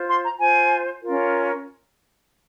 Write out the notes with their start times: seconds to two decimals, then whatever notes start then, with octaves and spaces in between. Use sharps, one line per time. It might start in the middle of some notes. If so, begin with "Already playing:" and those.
Already playing: F4 C5
0.09 C6
0.24 A#5
0.39 F4 C5 G#5
1.02 C#4 F4 A#4